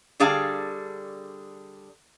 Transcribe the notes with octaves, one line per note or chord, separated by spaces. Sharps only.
D3 G3 G#4 D5 F5 A5